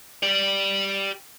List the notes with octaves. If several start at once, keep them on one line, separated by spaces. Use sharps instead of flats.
G4 D5